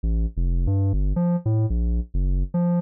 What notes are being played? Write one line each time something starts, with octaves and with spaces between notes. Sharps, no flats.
A1
F1
G2
G1
F3
A2
A#1
F#1
F3